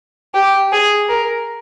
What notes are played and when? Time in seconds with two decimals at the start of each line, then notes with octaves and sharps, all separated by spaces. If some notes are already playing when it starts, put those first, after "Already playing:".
0.34 G4
0.72 G#4
1.09 A#4